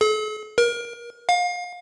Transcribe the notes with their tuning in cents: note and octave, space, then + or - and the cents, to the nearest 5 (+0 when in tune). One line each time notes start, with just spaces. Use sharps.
A4 -45
A#4 +30
F5 +30